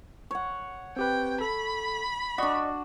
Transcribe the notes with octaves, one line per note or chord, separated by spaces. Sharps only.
C#5 F#5
C4 G4 B4 G5
A4 B5
D4 F#4 D5 D#5 C#6